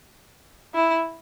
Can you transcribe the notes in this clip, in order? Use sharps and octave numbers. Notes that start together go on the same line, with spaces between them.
E4